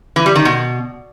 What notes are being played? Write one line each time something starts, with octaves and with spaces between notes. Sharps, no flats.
E3
G3
D#3
B2